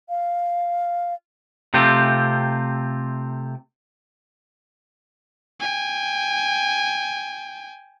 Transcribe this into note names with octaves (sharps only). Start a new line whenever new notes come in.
F5
C3 A3 C4 F4 G4
G5 G#5